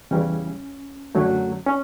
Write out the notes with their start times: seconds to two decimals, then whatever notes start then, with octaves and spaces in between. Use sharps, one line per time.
0.11 E2 C#3 E3 G3 C#4
1.15 F#2 D3 F#3 A3
1.66 C#4